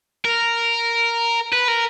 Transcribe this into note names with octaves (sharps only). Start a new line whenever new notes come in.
A#4
B4
A#4